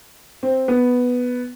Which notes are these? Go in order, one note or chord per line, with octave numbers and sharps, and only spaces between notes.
C4
B3